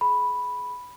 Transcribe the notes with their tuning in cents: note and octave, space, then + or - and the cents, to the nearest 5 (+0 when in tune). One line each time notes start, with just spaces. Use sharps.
G#4 +30 B5 +0